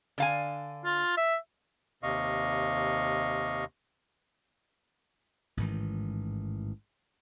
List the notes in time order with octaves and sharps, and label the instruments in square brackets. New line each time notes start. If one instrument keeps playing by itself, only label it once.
[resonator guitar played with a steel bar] D3 F5 G#5
[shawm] F4
E5
[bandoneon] D#2 C3 D#5 F5 C#6
[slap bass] A1 G#2 D#3 E3